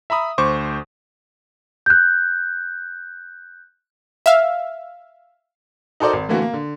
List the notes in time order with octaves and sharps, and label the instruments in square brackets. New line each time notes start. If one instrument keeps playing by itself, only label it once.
[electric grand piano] E5 A#5 B5 D#6
D2 C5 C#6 D6
[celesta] F#6 G6
[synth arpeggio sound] E5 F5
[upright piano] D#4 F#4 A4 A#4 C5 D5
G#1
D3 E3 A3 A#3 F#4
A#3
D3